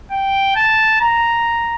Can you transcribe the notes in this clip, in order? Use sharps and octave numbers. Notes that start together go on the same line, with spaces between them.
G5
A5
A#5